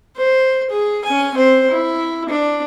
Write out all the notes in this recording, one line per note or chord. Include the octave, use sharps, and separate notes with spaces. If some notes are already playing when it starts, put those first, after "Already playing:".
C5
G#4
C#4 G#5
C4 C5
E4
D4